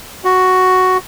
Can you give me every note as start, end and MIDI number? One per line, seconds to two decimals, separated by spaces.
0.25 0.97 66